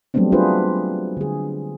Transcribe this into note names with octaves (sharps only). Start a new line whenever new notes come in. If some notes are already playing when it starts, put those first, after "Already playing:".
F#3 G3 A3 B3 C4 D4
D4 F4 G#4 B4 C5
D3 G#4